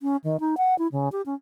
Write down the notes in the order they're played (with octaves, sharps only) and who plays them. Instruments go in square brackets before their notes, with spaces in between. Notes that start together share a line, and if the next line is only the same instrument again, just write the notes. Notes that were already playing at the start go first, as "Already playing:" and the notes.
[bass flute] C#4
D#3
D#4
F#5
E4
C#3
G4
C#4